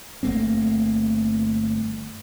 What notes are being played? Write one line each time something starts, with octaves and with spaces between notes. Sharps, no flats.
G1 A3 A#3 C4